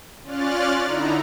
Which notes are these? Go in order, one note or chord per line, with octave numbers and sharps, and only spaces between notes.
C#4 F4 D5 F6 F#6 A6
D3 D#4 E4 A#5